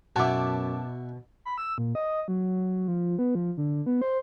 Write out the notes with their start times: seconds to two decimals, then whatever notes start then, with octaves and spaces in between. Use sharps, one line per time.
0.16 F#2 B2 E4 F#4 A5 D6
1.45 B5
1.58 E6
1.78 A#2
1.95 D#5
2.28 F#3
2.88 F3
3.19 B3
3.35 F3
3.57 D3
3.86 B3
4.02 C5